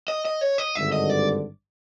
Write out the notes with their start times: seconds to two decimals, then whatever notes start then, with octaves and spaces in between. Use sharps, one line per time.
0.08 D#5
0.25 D#5
0.41 C#5
0.58 D#5
0.75 G#1 G2 D3 E5
0.92 D#5
1.10 D5